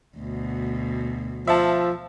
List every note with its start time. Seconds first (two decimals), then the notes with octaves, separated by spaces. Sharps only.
0.18 D2 B2
1.47 F3 E5 A5